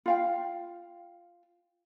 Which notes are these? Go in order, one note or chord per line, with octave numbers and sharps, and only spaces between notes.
F4 F5 G5